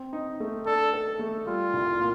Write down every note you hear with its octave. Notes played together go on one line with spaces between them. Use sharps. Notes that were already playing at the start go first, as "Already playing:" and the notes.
Already playing: C4
D#4
A3
D4 A4
A4
A3
G3 F4
C2
A#2